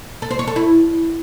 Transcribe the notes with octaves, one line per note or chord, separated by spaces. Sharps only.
A4
C5
C#5
A4
E4